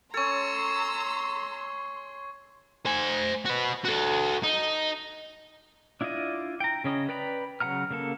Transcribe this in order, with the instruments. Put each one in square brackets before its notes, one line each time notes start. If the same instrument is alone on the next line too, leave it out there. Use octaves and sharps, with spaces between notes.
[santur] C#4 A4 [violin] A#5 E6 [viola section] C6 [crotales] C#6 G#6
[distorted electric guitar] C5 G#5
F#4 B4
F#4 A4
D#4
[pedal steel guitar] D4 E4 F4 D5 D#5
G5 A#5
C#3 C#4 D#5
B4 D5 G5 A#5 B5
C#3 F#3 F#5 A#5 F6
C#3 A#3 A4